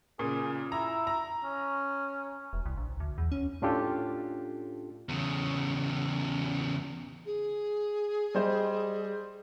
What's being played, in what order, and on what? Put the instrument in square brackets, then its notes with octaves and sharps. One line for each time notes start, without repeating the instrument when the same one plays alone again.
[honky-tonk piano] A#2 C#3 [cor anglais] G#4
[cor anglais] E4 [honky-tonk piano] A#5
[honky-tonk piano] A#5
[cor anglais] C#4
[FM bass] E1
C2
A#1
D2
E2
C#4
[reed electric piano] A2 C#4 D4 F4 G4 A4
[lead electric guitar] E2 C#3
[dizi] G#4
[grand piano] G3 C5 D#5